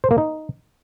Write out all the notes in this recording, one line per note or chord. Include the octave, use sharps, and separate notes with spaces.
C5
A#3
D#4